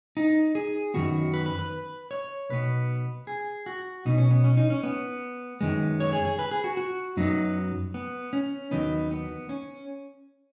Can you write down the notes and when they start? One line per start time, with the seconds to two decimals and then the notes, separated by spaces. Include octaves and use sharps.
0.17 D#4
0.55 G#4
0.94 F#2 D#3 B3 F#4
1.34 B4
1.46 B4
1.59 B4
2.11 C#5
2.49 B1 B2 B3 B4
3.27 G#4
3.66 F#4
4.05 B1 B2 B3 D#4
4.18 C#4
4.31 B3
4.44 C#4
4.57 D#4
4.70 C#4
4.83 B3
5.61 F#2 D#3 G#3 B3
6.00 C#5
6.13 G#4
6.25 G#4
6.39 B4
6.51 G#4
6.64 F#4
6.77 F#4
7.17 F#2 F#3 B3 D#4
7.94 B3
8.33 C#4
8.71 D#2 D#3 F#3 B3 D#4
9.11 B3
9.49 C#4